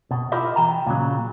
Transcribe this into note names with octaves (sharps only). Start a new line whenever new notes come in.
B2
E4 F4 G4 A#4 D#5 E5
E3 G5 A#5
A#2 C#3 F#3